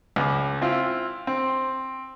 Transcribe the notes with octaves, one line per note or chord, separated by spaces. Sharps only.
C#2 D6
C4 E4 F4
C4